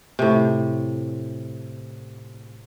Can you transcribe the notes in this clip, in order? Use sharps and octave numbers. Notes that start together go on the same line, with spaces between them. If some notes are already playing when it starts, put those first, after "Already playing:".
A2 C3